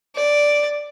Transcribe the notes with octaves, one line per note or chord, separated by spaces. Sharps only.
D5